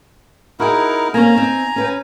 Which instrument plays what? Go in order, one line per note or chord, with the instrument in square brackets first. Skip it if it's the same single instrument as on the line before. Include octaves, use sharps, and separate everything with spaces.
[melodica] D#4 E4 A#4 [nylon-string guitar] F#4 G#4
[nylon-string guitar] A#3 C4 C#4 [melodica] G#5 A#5
[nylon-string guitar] C4 D#4
C#4 B4 G5